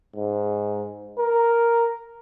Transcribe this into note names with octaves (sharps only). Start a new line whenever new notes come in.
G#2
A#4